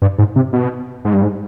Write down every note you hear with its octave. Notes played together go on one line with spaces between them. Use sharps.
G2
G#2
C3
B2
G#2
G2
G#2